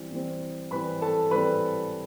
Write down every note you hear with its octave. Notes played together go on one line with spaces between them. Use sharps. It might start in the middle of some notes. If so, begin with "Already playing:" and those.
Already playing: E3 G3 C4
E3 G3 C4
E3 G3 C4 B4 B5
A4 A5
E3 G3 C4 B4 B5